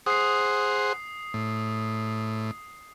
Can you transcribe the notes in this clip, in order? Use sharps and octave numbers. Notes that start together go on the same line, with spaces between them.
G#4 C5 F#5 D#6 C7
A2